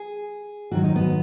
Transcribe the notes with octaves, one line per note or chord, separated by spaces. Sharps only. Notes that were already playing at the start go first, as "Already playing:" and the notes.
Already playing: G#4
G#2 D#3 F#3 F#4
D#4
B3